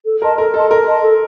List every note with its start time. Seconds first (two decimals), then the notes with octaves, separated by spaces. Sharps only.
0.05 A4
0.22 A#4 D#5 A5 C6
0.38 A4 A#4
0.54 A4 D#5 A5 C6
0.70 A4 A#4
0.86 D#5 A5 C6
1.03 A4